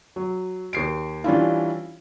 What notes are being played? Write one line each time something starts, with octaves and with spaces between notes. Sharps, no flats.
F#3
D#2 C7 D7
E3 G3 C#4 D4 E4 F4